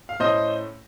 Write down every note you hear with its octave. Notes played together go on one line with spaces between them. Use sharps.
F5
A2 A3 C#4 C5 D#5